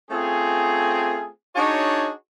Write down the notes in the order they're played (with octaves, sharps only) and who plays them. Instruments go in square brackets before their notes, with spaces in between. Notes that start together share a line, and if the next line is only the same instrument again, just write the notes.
[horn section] A3 C4 C#4 F4 G#4
D4 D#4 F#4 G#4 C#5